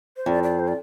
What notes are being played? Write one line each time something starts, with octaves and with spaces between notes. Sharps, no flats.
C5
F2 D5
D5
C5
D5